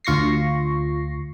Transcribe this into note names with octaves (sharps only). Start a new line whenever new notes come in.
D2 F4 C#6 A#6 C7